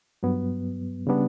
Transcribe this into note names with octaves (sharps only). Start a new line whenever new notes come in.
G2 F#3 B3
C#3 G3 B3 D4